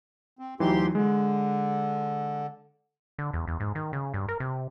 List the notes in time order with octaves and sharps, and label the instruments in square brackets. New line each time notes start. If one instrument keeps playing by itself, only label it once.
[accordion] C4
[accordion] D2 G4 C6 [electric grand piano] E3 F#3 D#4
[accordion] D3 [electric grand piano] G#3
[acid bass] D3
E2
E2
G#2
D#3
C#3
G2
A#4
C3